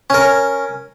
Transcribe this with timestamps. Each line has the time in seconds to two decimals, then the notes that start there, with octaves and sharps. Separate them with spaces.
0.10 C#4 A#4